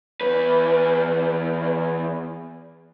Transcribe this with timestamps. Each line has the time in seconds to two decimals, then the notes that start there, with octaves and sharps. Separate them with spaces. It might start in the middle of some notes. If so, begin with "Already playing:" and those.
0.21 E2 B4